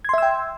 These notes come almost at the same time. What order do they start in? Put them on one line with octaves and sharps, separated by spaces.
G#6 C6 E5 E6 G5